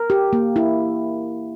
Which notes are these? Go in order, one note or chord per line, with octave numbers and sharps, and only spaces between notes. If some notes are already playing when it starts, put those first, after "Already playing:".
Already playing: A#4
G4
A#3
E4